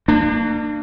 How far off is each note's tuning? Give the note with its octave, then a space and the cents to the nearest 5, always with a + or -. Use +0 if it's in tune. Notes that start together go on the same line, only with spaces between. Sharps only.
A#3 -30 D4 +35